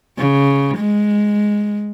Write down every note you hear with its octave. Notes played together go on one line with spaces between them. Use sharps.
C#3
G#3